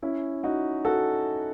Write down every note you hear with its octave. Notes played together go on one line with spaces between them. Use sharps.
C#4 E4
D#4 F#4
F#4 A4